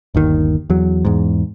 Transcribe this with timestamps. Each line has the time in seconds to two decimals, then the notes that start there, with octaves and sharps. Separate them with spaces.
0.15 G1 D#2 D#3
0.70 E2 F#3
1.05 E2 G#2